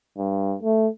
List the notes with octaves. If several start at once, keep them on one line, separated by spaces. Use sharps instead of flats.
G2
A3